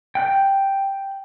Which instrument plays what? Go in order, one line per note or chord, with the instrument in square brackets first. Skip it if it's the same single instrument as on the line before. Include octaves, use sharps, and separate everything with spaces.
[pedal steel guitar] G5 F#6